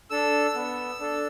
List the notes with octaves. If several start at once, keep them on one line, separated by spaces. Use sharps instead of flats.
D4 A4 E6
B3
D4 A4